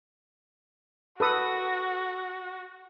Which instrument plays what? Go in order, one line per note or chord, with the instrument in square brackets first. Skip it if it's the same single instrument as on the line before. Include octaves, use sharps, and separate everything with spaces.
[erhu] F#4 [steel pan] A4 B4 D#6